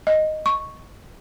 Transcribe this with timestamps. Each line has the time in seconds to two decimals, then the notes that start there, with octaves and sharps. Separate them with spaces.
0.07 D#5
0.46 C#6